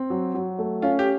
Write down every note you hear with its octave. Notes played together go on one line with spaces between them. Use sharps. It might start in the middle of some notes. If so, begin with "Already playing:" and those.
Already playing: C4
F#3
F#3
A3
C#4 F4
G4